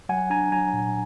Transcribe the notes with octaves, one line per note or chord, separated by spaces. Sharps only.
F#3 F#5 G#5
D4 G#5 A#5
F#3 G#5 A#5
A#2